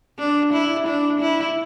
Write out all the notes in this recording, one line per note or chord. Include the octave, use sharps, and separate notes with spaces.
D4
E4
D4
E4